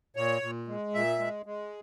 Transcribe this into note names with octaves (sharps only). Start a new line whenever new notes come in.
A#2 C#5
A#2
G#3
A#2 E5
G#3
G#3